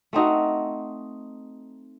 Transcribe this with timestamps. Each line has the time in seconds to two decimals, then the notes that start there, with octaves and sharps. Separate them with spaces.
0.13 A3 C4 D#4 F#4